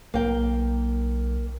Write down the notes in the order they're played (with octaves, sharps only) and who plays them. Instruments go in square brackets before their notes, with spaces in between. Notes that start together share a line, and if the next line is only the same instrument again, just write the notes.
[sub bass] B1 [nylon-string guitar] A#3 G5